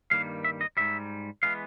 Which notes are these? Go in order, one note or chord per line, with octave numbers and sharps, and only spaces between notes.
G2 D#3 G3 A#3 F5
E5
D#5
G#2 D#3 G3 E5
E3 G#3 B3 F5